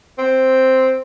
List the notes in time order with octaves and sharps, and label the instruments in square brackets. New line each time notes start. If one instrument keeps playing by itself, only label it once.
[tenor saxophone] C4